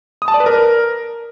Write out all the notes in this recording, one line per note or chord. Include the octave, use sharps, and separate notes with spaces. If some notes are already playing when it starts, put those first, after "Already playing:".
D#6
A5
D5
B4
A#4